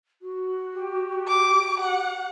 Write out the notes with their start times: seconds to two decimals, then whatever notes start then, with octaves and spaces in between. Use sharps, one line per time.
0.22 F#4
0.74 G4
1.28 D6
1.80 F#5